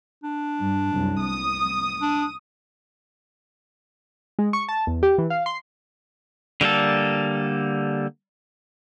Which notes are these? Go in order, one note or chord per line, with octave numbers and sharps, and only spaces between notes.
D4
G2
C2 F#2
D#6
D4
G#3
C#6
A5
E2
G4
E3
F5
C6
D3 G3 A#3 A4